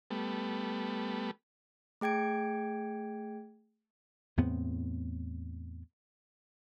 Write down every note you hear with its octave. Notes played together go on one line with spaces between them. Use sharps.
G3 A3 B3
A3 G#4 G5 G#6 D7
E2 A2 B3 C4